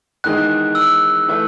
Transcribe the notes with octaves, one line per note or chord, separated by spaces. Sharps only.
E2 D#3 G#3 D#4 F#6
E6
E3 A3